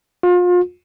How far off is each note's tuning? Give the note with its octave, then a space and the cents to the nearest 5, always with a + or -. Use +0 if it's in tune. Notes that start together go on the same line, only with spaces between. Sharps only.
F4 +35